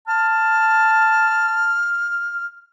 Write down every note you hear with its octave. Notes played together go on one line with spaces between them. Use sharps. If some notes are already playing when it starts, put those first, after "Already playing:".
A5 F6